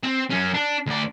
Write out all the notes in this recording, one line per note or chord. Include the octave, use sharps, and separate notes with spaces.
C4
F#2 C#4
D4
D2 D5